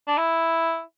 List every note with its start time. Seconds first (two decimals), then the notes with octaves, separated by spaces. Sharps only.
0.07 D4
0.18 E4